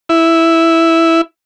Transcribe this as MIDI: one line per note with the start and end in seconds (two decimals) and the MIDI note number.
0.09 1.21 64